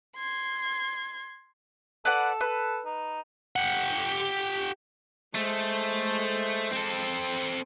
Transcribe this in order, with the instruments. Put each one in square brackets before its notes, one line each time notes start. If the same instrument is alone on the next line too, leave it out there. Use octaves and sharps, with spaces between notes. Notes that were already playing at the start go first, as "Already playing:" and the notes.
[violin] C6 G#6
[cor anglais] A4 [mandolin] B4 D5 F#5
[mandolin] B4
[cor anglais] D#4
[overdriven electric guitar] G4 F#5
[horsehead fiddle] G#3 C5 [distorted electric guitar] A3
[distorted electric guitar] C4 A4